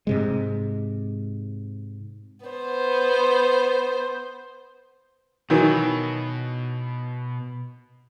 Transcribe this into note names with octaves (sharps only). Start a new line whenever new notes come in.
G#2 C3 G#3
B3 C5
B2 D#3 E3 F#3